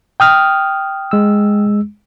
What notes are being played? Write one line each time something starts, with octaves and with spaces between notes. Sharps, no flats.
G5 D#6 F6
G#3 E6